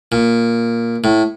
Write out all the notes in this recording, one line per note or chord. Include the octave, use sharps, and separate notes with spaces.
A#2
A2